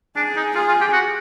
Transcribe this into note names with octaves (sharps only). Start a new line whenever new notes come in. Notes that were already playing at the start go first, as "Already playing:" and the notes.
D4 G#4
D#4
F4 G#4
F4
G4
F#4